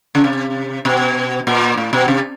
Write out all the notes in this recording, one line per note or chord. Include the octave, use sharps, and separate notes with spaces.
C#3
C3
B2
A#2
A2
B2
C3